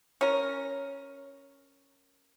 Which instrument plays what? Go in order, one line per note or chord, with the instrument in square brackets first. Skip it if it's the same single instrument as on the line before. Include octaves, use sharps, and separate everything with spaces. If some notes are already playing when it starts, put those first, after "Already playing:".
[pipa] C#4 A#4